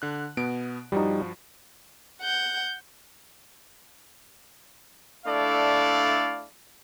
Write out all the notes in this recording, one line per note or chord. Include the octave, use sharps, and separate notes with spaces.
D3 F#6
B2 B3 D7
G2 F3 G3 D#4 F#4
F#5 G6
A3 D4 E4 A4 D5 F5